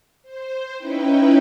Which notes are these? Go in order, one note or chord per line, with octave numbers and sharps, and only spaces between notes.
C5
C#4 D#4 E4 B4 G5